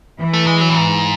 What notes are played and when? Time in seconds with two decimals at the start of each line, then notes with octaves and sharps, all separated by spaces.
0.19 E3
0.33 A3
0.47 G#3
0.61 F#3
0.69 A2
0.76 G#2